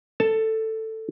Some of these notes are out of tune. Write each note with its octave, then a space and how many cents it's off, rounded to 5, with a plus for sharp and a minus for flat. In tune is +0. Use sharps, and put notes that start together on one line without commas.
A4 +10 A5 +0